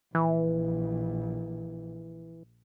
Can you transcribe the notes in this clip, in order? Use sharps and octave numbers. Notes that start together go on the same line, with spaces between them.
A#1 E3